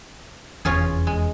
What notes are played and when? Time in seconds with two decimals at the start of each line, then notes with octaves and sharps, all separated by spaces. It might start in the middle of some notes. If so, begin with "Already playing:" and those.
0.65 F1 E2 C#4 F4 G#4
1.07 G#3